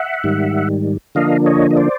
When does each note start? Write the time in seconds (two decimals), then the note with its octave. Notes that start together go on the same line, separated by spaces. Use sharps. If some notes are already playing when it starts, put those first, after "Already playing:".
Already playing: E5 F#5
0.24 G#2 D#3 G3
1.15 D3 F3 A#3 D4 D#5 F5
1.46 C#5 D#5
1.71 D#5
1.77 C5 D5